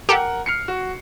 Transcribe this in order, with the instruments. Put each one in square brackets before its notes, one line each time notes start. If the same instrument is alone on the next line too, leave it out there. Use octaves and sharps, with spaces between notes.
[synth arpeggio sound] G4 A4 [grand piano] A#4 F#5
[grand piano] F6 C7 C#7
F#4